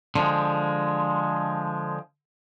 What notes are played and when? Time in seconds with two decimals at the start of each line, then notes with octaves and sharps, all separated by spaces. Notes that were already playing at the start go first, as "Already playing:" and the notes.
0.15 D3 F3 G#3